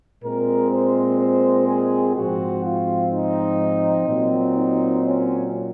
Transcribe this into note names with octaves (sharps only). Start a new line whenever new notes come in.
A#2 G#3 C4 A#4
C5
C5
G#4
G#2 F3 C4 F#4
F4
D#4
A#2 F#3 C4
D#4
C#4